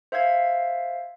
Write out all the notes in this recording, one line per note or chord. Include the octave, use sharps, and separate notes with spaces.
C5 E5 F5 E6 G#6